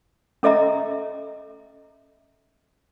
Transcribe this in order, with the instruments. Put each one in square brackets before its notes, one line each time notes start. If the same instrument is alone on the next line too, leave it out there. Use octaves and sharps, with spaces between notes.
[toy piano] C#4 A4 D#5 E5 A#5